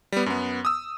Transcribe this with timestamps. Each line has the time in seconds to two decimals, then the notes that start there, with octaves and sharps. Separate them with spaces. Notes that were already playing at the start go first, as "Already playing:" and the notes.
0.12 G3 B3
0.26 F#2 B3
0.65 D#6 E6